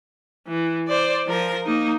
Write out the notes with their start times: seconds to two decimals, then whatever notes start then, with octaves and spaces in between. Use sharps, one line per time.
0.47 E3
0.88 C5 D5
1.27 F3 A#4
1.66 A#3 D#4